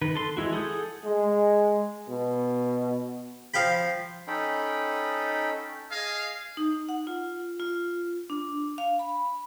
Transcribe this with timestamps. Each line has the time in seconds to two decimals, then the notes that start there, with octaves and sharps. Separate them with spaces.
0.01 D#3 B4
0.15 A4 C6
0.37 E3 G#3 E4 F#4
0.52 G#4 A4 F#5 D#6 G6
1.05 G#3
2.09 B2
3.54 F3 F5 G5 B5
4.28 C#4 D#4 A4 G5 B5
5.90 G#4 D#5 F5
6.57 D#4
6.89 F#5
7.07 F4
7.60 F4
8.30 D4
8.78 F5
8.99 B5